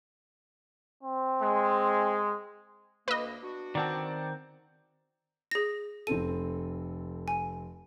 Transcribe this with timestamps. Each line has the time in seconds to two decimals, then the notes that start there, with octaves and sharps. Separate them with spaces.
1.03 C4
1.42 G#3
3.08 D2 A#3 B4 D#5
3.42 B3 D4 F#4
3.75 D#3 C4 D5 F#5 A5
5.51 G#4 A#6
6.07 F1 C4 A4 D#7
7.28 G#5